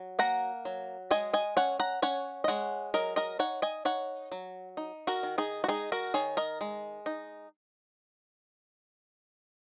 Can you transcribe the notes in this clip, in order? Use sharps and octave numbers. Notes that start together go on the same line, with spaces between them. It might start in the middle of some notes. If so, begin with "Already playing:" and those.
Already playing: F#3
A#3 F#5 A#5
F#3
G#3 D#5 G#5
D#5 G#5
C#4 C#5 F#5
F#5 A#5
C#4 C#5 F#5
D#5
G#3 C#5 F#5
F#3 A#4 D#5
A#4 D#5
D#4 C#5 F#5
D#5 G#5
D#4 C#5 F#5
F#3
D#4
F#4 A#4
D#3
D#4 G#4
F#4
G#3 D#4 G#4
F#4 A#4
D#3 G#4 C#5
A#4 D#5
G#3
D#4